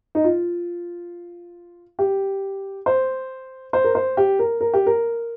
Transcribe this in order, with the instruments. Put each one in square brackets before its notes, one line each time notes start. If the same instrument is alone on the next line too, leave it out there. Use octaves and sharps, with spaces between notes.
[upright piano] D#4
F4
G4
C5
C5
A#4
C5
G4
A#4
A#4
G4
A#4